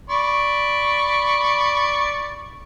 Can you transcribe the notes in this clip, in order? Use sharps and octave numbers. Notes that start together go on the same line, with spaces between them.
D5 B5 C#6